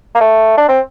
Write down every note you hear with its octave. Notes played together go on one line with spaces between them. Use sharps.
A#3
A3
D4
C4